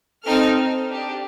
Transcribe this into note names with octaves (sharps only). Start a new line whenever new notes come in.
C4 D#4 A4 F6
D4 G4